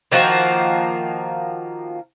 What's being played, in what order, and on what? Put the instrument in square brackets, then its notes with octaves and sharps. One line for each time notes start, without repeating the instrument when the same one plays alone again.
[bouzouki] D#3 F3 A#3 F#4